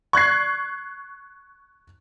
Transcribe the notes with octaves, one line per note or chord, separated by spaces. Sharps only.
C#6 F#6 G#6 C7